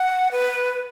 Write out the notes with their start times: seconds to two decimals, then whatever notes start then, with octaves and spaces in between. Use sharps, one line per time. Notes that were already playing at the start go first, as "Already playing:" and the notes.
Already playing: F#5
0.32 B4